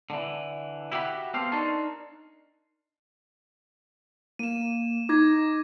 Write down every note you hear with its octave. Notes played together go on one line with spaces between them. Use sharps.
D3 E3
E4 F#4 G4 E5 F#5 B5
B3 C4 G4 A4 C5 F5
D4 D#4 A#4 C#5 A5 C6
A#3 D#7 E7
D#4 D6 G#6 A#6